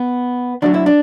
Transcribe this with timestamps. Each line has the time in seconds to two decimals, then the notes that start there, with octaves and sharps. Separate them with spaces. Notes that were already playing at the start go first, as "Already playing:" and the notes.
Already playing: B3
0.62 D2 D3 F#3 D4
0.74 E4
0.86 D4